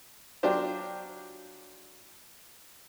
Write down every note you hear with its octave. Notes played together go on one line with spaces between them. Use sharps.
F#3 D4 F4 G4 C5